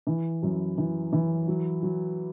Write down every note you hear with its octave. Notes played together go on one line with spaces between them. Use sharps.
E3
F#2
E3
E3
F#3
F#3